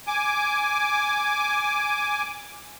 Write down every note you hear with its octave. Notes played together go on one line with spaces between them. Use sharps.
G#5 D6